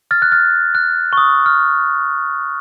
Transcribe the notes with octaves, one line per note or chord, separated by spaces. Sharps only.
F6 A6
F#6
F6 A6
F#6
C#6
D#6
F6